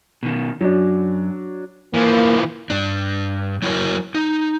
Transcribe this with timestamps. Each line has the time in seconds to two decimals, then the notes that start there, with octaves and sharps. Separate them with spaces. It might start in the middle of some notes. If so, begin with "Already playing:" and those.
0.23 B2 D#3
0.61 F#2 F#3 D4
1.94 E3 F3 A#3
2.70 G2 D4
3.62 F#3 E4 F#4 A#4 C#5
4.15 D#4